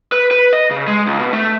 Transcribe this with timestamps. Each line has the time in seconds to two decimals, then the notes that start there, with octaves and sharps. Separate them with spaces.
0.12 B4
0.31 B4
0.53 D#5
0.71 C#3
0.87 G#3
1.07 C#2
1.19 B2
1.33 A3